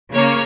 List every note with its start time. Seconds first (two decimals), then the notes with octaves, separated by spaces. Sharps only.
0.12 C#3 A#3 C#5